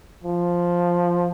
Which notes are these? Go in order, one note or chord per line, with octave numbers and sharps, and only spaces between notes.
F3